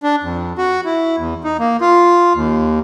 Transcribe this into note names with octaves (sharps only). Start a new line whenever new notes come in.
D4
F2
F#4
E4
E2
D#4
A#3
F4
D#2